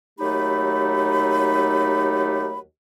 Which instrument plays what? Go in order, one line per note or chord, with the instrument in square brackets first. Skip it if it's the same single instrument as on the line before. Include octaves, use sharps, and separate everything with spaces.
[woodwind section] D#2 F#3 A3 D#4 G4 B5